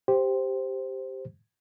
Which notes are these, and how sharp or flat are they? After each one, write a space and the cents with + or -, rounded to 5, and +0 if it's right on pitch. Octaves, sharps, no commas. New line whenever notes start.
G4 +0 C5 +0